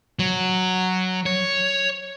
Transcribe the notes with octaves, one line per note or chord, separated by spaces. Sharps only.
F#3
C#5